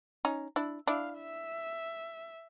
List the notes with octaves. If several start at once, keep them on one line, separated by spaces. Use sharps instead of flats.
C#4 D#4
D4 E4
D4 E4 F5
E5